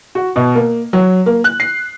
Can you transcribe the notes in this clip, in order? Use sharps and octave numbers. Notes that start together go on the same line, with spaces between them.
F#4
B2
A#3
F#3
A#3
F#6
C7